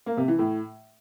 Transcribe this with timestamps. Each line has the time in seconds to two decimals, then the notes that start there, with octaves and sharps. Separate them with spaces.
0.06 A#3
0.17 C3
0.28 E3
0.39 A2